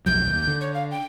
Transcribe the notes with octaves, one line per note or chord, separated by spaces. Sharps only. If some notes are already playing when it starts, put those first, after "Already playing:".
B1 F2 F#3 G6
D#2
D3
C#5
F5
G5